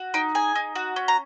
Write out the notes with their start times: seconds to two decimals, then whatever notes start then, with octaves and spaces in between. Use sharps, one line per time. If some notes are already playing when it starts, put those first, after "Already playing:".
Already playing: F#4
0.14 D#4 G5
0.35 G#4 G#5
0.56 D#4
0.75 F#4
0.96 C#4
1.08 A#5